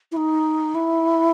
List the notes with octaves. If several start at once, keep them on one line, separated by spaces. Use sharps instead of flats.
E4
D#4
E4